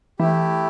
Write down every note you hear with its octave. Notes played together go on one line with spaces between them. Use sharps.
E3 A3 E4 G4